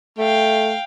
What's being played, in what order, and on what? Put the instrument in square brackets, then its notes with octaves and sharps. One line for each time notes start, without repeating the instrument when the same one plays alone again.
[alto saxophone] A3 [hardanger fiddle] F5 G5